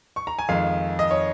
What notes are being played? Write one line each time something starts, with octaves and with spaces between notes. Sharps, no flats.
C#6
A#5
G#5
F2 D#3 G#3 F5
D#5
C#5